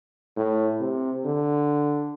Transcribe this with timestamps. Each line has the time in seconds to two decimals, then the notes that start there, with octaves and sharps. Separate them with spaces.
0.37 A2
0.80 C3
1.25 D3